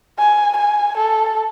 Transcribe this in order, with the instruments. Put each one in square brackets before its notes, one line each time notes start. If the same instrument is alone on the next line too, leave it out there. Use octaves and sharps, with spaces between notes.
[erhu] G#5
G#5
A4